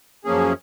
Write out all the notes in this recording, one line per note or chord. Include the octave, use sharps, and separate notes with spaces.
F#2 F3 A#3 C#4 G#4